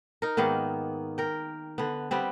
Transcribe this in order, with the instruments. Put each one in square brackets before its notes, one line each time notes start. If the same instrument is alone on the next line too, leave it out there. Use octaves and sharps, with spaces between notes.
[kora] D#4 A#4
G#2 D#3 A#3 B3
A#4 G5
D3 B3
G3 B3 C4